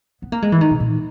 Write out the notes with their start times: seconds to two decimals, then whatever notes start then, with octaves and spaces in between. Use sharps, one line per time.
0.22 B3
0.32 A#3
0.42 G#3
0.52 E3
0.61 D#3
0.71 B2
0.80 A#2